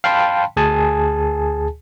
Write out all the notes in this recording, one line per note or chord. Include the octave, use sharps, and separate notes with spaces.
F5 G5 A5 B5 C6
D2 G#4 G#5 A5